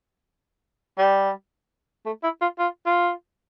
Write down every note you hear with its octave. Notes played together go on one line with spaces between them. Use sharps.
G3
A3
E4
F4
F4
F4